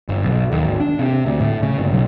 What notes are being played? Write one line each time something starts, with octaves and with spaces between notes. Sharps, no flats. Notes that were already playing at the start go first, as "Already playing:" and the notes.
G1
B1
D#2
G#1
D4
C3
D2
A2
C#3
G1
B1